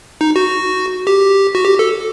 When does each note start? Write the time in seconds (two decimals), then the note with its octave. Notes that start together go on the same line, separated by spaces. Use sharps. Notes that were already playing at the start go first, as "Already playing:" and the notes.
0.21 D#4
0.36 F#4
1.07 G4
1.55 F#4
1.65 G4
1.79 A4